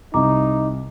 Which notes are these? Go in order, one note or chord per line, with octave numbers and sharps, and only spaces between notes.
C2 D#4 A#5 D6